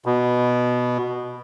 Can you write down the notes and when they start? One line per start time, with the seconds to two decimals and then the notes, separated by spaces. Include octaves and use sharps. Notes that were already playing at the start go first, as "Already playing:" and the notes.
0.06 B2